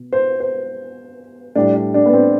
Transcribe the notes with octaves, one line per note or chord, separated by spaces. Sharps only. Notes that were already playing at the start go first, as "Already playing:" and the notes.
Already playing: B2
C5
C5
A2 G3 D4
D4
D4
B3
C4